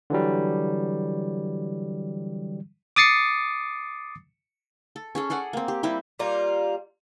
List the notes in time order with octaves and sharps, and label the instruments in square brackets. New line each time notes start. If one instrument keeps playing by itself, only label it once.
[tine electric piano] D3 E3 F#3 G3
D6 D#6 A6 C7 C#7
[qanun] A4
C#4 G#4 A4
G#4 A4 D5 F#5
A#3 C4
G4
G3 C4 E4 G4
[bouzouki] G3 A#3 F4